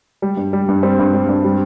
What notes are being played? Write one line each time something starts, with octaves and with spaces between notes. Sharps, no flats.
G3
G2
G3
G2
G3 C4
G2
G3
G2
G3